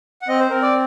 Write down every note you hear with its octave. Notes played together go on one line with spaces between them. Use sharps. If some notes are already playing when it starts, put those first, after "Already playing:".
F#5
C4 D#5
C5
C4 A#4
D5